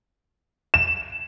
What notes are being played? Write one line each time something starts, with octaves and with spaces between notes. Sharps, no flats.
E7